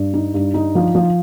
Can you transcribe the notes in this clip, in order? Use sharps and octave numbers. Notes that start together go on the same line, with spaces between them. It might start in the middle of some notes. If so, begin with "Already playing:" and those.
Already playing: G2
D#4
G2
D#4
F3
F3